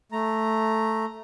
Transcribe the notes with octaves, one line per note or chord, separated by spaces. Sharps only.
A3 A#5